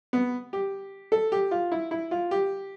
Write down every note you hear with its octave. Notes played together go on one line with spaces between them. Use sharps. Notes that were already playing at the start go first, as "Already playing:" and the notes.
B3
G4
A4
G4
F4
E4
E4
F4
G4